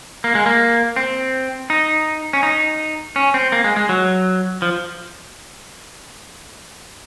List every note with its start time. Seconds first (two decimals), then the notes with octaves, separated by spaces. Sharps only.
0.24 A#3
0.35 G#3
0.46 A#3
0.96 C4
1.70 D#4
2.33 C#4
2.43 D#4
3.16 C#4
3.34 C4
3.52 A#3
3.64 G#3
3.76 G#3
3.89 F#3
4.62 F3